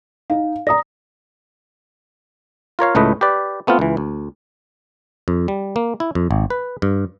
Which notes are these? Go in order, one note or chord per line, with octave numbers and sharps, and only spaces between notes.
D#4 F5
D5 A#5 D#6 A#6
F4 A#4 C#5 F5
C#2 A2 A3 B4 D#5
G4 B4 D5
A3 B3 C4 F4
C#2 E3
D2
F2
G3
A#3
E4
F2
G#1
B4
G2